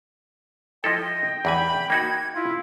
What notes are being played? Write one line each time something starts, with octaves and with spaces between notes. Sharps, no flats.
F3 E4 A4 D#5 G5
E2 E3 G#5 B5
A#3 D#4 F#4 G#6
E4 F4